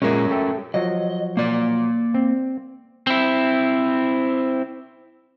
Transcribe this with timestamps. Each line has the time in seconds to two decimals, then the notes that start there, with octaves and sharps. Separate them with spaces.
0.02 A#2 G#3 C#4 A#4
0.31 A3 A4 G5
0.74 F3 F#3 D#5
1.37 A#3 D5
2.14 C4
3.07 C4 E4